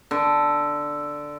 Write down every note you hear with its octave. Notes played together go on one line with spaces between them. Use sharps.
D3